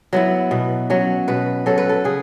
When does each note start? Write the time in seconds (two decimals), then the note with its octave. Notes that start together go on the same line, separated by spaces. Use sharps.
0.13 F#3 B3 E4
0.51 B2
0.90 F#3 C#4
1.28 B2 B4
1.66 F#3 C#4 A4
1.78 B4
1.89 A4
2.04 C#3 G#4